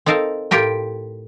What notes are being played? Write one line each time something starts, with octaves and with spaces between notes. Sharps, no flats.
C4 D#4 A4 A#4 F5
A2 F4 G4 A#4 G5